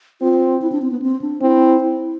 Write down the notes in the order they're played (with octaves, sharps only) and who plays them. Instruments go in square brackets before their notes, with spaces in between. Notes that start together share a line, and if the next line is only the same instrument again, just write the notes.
[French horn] C4 [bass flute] F4
[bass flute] E4
D4
C4
B3
C4
D4
[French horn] C4 [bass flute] E4
[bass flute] E4